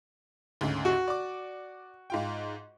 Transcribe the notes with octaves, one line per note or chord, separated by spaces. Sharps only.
D2 G#2 C#3
F#4
D5 D6
G#2 F4 G5